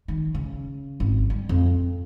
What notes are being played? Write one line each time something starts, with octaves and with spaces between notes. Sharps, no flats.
D#3
C#3
G#1
G3
F2